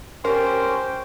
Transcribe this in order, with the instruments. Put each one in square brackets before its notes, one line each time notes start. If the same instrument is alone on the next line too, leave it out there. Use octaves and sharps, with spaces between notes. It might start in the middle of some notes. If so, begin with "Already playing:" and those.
[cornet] C#4 [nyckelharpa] G4 G5 [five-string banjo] A#4 [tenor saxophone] C5